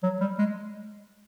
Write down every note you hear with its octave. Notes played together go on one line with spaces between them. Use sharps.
F#3
G3
G#3